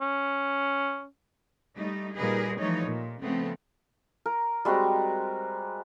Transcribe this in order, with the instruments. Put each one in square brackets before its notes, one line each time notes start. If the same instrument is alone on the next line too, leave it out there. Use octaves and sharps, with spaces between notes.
[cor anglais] C#4
[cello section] G3 A3 D#4
A#2 G3 D#4 G#4 A#4 B4
E3 F3 G3 A3 D#4 C#5
A#2
C#3 F3 A3 B3 C4
[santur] A#4
G3 G#3 C4 F#4